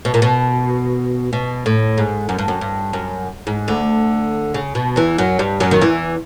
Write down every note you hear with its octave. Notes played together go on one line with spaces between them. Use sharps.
B2
A#2
B2
B2
A2
G#2
F#2
G2
F#2
G2
F#2
G#2
D2 D3
C#3
B2
E2 E3
F#2 F#3
G2 G3
F#2 F#3
D#3
E2 E3